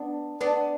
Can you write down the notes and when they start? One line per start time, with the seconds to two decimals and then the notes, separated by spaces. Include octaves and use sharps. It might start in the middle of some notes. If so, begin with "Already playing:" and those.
Already playing: B3 D4
0.41 B3 D4